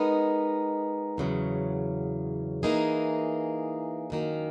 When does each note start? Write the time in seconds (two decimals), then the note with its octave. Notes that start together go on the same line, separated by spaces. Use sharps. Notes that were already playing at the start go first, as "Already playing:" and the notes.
Already playing: G#3 B3 D#4 A#4
1.18 E2 C#3 F#3
2.63 E3 A#3 D#4 G#4
4.10 F#2 D#3 A#3